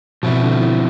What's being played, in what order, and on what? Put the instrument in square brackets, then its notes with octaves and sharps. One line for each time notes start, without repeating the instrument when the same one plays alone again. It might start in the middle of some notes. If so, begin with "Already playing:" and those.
[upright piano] B2 [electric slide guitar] F3 C4 E4
[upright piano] D3
E3